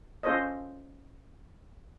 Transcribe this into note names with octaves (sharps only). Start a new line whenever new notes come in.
C#4 F4 A4 C5 C#5 D#5